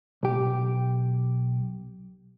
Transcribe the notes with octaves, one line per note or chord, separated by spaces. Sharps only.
B1 G4